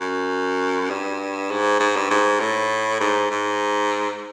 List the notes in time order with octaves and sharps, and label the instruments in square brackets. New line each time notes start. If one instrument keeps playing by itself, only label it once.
[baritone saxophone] F#2
G2
G#2
G#2
G2
G#2
A2
G#2
G#2